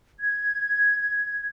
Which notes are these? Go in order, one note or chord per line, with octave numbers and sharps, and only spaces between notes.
G#6